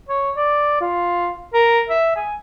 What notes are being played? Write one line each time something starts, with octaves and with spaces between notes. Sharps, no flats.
C#5
D5
F4
A#4
E5
G#5